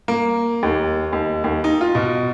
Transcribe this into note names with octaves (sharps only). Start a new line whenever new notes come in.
A#3
D#2
D#2
D#2
D#4
F4
B2